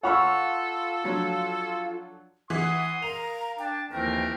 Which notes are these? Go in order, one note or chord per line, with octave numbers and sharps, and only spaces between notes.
F4 A4 C#5 F#5 B5 C#6 E6 F6
F3 F#3 D4
E3 F#5 C6 D#6
A#4 F5 A#5 F7
D4 G5 A5
D#2 E3 F3 A3 C4 A#4 G5